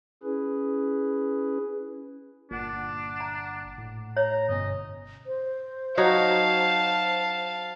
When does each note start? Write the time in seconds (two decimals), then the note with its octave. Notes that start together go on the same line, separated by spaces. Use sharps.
0.23 C#4 E4 G#4 B4
2.51 G1 A#2 D4 F#5
3.20 A#5
3.78 A2
4.17 C#5 A#5
4.49 G1 B2 C#4 D#5
5.26 C5
5.98 F#3 D#4 C#5 F5 A5